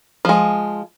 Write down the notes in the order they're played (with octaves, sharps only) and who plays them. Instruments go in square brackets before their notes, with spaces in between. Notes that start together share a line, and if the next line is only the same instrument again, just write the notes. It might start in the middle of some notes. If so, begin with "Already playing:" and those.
[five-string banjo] F3 G#3